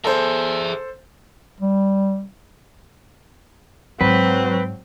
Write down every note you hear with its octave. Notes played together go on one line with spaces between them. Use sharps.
G#4 A4 C5 E5
G3
G#2 F#3 C4 B4